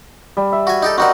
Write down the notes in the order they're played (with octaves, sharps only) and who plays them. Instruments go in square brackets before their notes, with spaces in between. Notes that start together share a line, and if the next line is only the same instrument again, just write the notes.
[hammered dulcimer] G3
E5
[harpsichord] F#4 G#5
D#4 G4 A4
[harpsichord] C4 D#4 F#5 [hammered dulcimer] F#4 A#4 D5